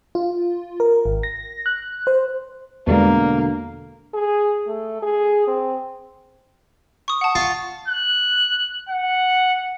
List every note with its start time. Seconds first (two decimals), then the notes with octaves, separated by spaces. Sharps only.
0.15 F4
0.80 A#4
1.05 G#1
1.23 A#6
1.66 F#6
2.07 C5
2.87 E2 B2 D3 G3 G#3 A#3
4.14 G#4
4.67 A3
5.02 G#4
5.48 C4
7.08 C#6 D#6
7.21 F#5 A5
7.35 F4 F5 C#6
7.88 F#6
8.89 F#5